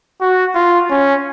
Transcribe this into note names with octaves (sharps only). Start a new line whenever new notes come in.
F#4
F4
C#4